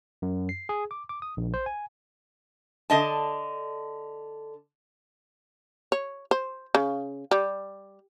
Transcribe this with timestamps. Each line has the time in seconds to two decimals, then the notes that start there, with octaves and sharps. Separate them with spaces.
0.22 F#2
0.49 C7
0.69 G#4
0.91 D6
1.09 D6
1.22 D#6
1.37 A#1
1.54 C5
1.66 G#5
2.90 D3 D#5 A5
5.92 C#5
6.31 C5
6.75 C#3
7.31 G3